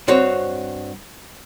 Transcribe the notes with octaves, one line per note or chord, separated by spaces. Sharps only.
G2 C4 F#4 C5 C#5